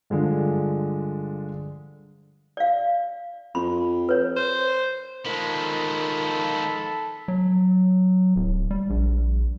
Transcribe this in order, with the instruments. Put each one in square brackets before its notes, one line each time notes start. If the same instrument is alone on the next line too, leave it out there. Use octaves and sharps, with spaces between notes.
[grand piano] G2 D3 F3 G#3 D4
[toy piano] D5 F5
[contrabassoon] F2 [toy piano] B5 C6
[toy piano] B4 C#5
[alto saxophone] C5
[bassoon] D#3 [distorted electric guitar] F3 G#3 [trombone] A4 [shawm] B5
[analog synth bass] F#3
D1
G3
A#1